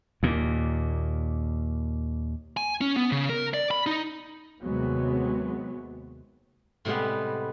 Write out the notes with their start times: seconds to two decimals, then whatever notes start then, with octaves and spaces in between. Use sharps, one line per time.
0.23 D#2 A#2
2.57 G#5
2.81 C#4
2.96 B3
3.12 C#3
3.29 A#4
3.54 D5
3.71 B5
3.86 D#4
4.63 D#2 C3 F#3 G#3 B3
6.85 A2 C3 G3 G#3 B3